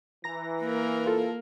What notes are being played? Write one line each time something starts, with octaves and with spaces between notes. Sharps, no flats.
E3 A#5 A#6
A#3 A#4
F4 A4